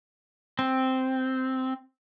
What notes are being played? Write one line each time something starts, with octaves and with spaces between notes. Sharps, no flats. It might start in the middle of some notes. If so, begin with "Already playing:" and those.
C4